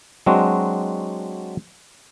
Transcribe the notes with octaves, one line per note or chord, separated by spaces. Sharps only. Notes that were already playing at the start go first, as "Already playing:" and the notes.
F#3 G#3 C4 D4 F#4